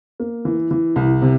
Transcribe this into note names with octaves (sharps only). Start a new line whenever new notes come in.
A#3
E3
E3
C2
C3